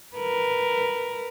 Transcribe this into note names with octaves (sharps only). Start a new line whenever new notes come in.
A#4 B4